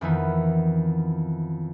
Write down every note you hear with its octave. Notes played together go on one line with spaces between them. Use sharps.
F2 D#3 E3 B3